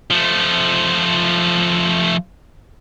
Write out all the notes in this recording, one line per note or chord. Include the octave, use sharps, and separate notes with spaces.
F3 A3